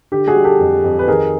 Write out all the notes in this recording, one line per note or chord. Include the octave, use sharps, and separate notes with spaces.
D3 G4
F#4 G#4
G3
G4 A4
F2
F2
B4
D#3 G#4 A#4